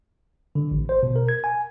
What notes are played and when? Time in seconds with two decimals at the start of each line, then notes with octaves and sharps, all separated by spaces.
0.55 D3
0.71 A1
0.89 C5
1.03 B2
1.16 A#4
1.29 G#6
1.44 G#5